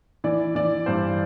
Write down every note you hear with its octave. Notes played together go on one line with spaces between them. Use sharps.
E3 D5
E3 D5
G2 C5